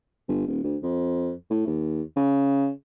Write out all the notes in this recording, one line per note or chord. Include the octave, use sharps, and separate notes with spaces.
G1
D#1
D2
F2
A2
D#2
C#3